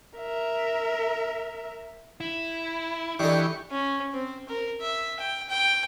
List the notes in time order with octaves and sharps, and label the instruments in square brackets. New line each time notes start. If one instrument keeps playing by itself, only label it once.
[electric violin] A#4 E5
[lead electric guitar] E4
[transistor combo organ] E3 G4 C#6 [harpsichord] D4 D#4 A4
[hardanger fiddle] C#4
C4
A#4
E5
G5
G5